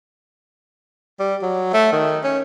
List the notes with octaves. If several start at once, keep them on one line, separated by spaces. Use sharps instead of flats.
G3
F#3
A3
D#3
C#4